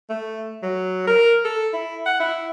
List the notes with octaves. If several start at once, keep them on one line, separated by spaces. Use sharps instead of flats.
A3
F#3
A#4
A4
E4
F#5
E4